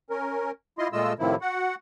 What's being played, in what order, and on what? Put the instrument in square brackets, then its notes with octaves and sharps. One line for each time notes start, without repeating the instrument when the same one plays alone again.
[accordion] C#4 A#4
E4 F4 D#5 C6
A#2 G#3 A3 F4 D#5 E6
A2 C3 D#3 F3 E4
F#4 F#5